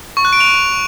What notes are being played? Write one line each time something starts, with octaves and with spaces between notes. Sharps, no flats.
C#6
F#6
D7
F7